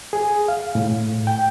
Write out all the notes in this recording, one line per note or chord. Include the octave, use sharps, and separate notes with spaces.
G#4
F5
A2
G5